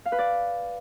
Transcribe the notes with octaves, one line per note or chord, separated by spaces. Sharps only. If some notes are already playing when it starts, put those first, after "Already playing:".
F5
B4
D5